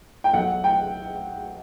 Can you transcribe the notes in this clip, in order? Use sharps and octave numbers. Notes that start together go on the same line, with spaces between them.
G5
B1 F#5
G5